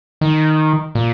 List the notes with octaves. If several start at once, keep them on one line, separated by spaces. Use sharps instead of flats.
D#3
A#2